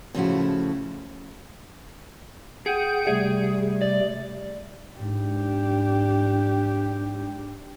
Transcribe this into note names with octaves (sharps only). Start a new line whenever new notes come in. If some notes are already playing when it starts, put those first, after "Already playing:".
A2 C#3 F3 A3 E4 F#4
G#4 F#5 G5 G6
C3 G3 A3 G#4
D5
G#2 D4 G4